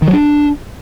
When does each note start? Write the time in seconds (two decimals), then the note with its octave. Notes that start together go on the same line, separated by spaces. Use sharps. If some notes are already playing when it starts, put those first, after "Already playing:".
0.02 D#3
0.08 F#3
0.13 D4